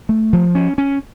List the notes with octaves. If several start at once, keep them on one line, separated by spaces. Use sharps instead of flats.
A3
F3
C#4
C#4